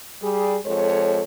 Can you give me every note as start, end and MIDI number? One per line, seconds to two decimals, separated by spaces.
0.22 0.57 55
0.22 0.57 68
0.65 1.21 41
0.65 1.21 56
0.65 1.21 69
0.65 1.21 73